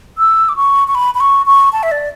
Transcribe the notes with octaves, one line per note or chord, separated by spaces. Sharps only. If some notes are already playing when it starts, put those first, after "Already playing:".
E6
D6
C#6
C#6
B5
B5
C#6
C#6
A5
E5
D5